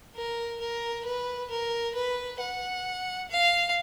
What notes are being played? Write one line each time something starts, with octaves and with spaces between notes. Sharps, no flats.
A#4
A#4
B4
A#4
B4
F#5
F5